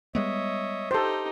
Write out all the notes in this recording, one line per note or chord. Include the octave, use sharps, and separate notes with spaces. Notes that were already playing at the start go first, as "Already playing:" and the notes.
G3 G#3 B3 C#5 D#5 E5
D#4 G4 A4 C5